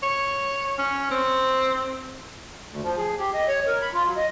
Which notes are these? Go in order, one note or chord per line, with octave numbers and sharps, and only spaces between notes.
C#5
C#4
C4
D2
F3
G#4
G4
D#5
C#5
A#4
B5
F4
F#3
D#5